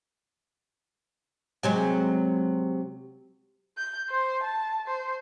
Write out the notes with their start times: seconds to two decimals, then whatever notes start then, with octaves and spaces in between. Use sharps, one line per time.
1.63 C3 F#3 G#3
3.77 G6
4.09 C5
4.43 A5
4.88 C5